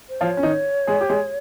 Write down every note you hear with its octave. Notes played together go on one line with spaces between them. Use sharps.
C5
F3 F4 C#5
C#4
D#3 D#4
G#3 G#4
G4
G#3 G#4